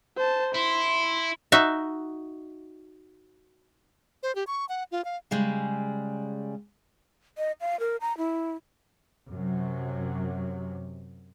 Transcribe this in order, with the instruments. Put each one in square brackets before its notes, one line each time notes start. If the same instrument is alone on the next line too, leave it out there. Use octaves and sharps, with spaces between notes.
[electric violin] C5 A5
[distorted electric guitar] E4 [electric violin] C6
[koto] D#4 F#4 E5
[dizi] C5
G4
C#6
F#5
F4
F5
[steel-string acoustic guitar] C#3 G3 G#3
[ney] D#5
F5
A#4
A#5
E4
[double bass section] F#2 C3 F#3